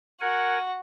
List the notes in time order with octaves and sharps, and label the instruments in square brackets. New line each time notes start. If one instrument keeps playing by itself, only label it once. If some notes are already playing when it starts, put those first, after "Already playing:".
[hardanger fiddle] F#4 [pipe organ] A#4 F#5 G#5